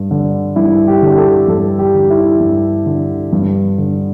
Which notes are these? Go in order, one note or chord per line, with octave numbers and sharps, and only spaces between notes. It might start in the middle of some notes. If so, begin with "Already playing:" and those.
Already playing: G2
D3
G2 E4
G4
D3
G4
A4
G2 A4
G4
D3
E4
G2
D3
G2
D3